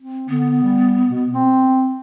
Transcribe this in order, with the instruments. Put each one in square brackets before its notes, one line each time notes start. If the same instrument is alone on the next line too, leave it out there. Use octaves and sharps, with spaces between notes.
[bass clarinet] C4
[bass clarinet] D3 [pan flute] B3
[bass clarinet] G3
B2
C4